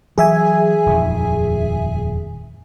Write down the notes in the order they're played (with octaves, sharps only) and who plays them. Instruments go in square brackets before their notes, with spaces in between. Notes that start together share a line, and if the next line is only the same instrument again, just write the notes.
[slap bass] E3 F#3 [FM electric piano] G#4 E5 G#5
[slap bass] D#1 F2 D#3